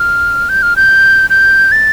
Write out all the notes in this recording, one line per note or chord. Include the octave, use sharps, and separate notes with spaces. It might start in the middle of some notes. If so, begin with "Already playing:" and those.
Already playing: F6
G6
F6
G6
G6
A6